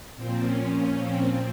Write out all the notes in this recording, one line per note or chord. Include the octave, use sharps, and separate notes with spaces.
A#2 F3 C4
C#4
C#4
C4